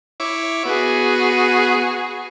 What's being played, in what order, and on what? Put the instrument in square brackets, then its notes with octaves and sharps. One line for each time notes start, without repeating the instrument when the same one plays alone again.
[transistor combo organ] E4 C#5 D6
[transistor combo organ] B3 [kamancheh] F#4 G#4